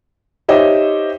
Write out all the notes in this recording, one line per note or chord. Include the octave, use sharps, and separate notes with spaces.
D#4 G4 C5 C#5 D#5 E5